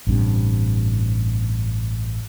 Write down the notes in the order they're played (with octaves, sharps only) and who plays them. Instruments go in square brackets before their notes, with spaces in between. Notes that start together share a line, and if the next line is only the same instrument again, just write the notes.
[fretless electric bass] A1 G2 C3